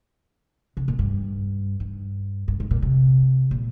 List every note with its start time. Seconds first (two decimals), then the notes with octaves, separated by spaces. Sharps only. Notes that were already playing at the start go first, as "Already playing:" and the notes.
0.77 C3
0.88 A#2
0.99 G2
1.80 G2
2.48 G2
2.60 G#2
2.71 A#2
2.82 C3
3.51 A#2